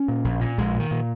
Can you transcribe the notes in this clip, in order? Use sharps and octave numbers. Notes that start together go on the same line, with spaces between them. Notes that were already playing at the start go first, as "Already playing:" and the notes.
Already playing: C#4
A#2
A#1
A#2
A#1 G#3
A#2 D#3
A#2